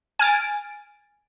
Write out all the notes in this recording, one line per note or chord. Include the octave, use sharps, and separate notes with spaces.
G#5 F6 A6 D7